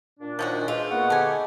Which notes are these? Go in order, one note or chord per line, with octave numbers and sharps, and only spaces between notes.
A#2 D4
D#3 F3 C#4 F#4
G#3 F4 B4 C5 E5
A#3 B3 F#5 C#6
G#2 D3 G4 A4 G#5